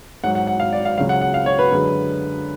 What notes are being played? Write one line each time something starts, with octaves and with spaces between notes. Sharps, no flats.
G#2 F#3 F#5
F#5
F#5
F5
D5
F5
C#2 C#3 F#3 F5
F#5
F#5
F5
C#5
B4
F#2 D3 G#3